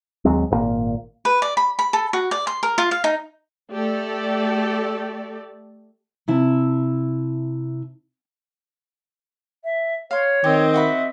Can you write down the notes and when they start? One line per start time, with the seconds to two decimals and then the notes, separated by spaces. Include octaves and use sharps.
0.25 D#2 F#3 G#3 C4
0.51 G#1 G2 A#2 A#3
1.25 B4
1.42 D5
1.57 B5
1.79 B5
1.93 A4
2.13 F#4
2.31 D5
2.47 C6
2.63 A#4
2.78 F4
2.91 F5
3.04 D#4
3.72 A3 G4 A4 D5
6.28 C3 E4 A5
9.64 E5
10.11 C#5 F5 C6
10.44 D#3 C4 G4 D#5
10.74 F#4 E5 F#5 B5